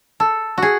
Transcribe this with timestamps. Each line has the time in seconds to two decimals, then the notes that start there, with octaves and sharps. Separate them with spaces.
0.20 A4
0.58 F#4 G#4